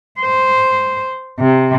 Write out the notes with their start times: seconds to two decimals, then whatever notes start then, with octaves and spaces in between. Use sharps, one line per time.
0.21 C5
1.39 C3